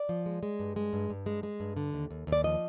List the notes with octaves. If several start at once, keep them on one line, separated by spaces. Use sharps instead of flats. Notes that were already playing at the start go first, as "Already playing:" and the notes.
Already playing: D5
F3
G#3
G#3
G2
G#3
G2
G2
G#3
G#3
G2
D3
D#2
D#2
D#2
D5
F3 D#5